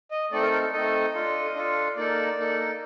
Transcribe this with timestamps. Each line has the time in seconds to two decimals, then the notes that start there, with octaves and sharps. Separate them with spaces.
0.11 D#5
0.31 A3 C4 D#4 A4 D5
0.42 A#4
0.52 A#4
0.62 A4
0.73 A3 C4 D#4 A4 D#5
1.14 D4 F4 A4
1.55 D4 F4 A4
1.96 A#3 D#4 A4 D5
2.38 A#3 D#4 A4